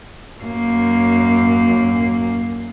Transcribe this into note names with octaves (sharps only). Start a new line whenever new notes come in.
F#2 A#3